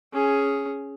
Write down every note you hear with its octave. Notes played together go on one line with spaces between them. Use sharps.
C#4 G#4